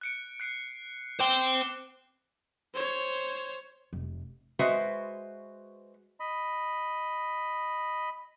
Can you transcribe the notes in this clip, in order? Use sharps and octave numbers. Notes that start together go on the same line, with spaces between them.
F#6 C#7 D7
F#6 C7 D7
C5 G5 D6 E7 G7
C5 C#5
F1
G#3 F#4 B4 C5 E5
D#5 B5